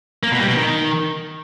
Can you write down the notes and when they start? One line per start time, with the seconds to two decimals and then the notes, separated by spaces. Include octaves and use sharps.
0.23 A#3
0.31 B2
0.40 G3
0.48 B2
0.57 D#3